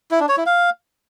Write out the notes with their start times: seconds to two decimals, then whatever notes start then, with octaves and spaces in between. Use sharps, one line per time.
0.11 E4
0.20 D4
0.29 C#5
0.37 E4
0.46 F5